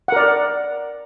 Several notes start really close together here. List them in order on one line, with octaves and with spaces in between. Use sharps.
F#5 A#4 D5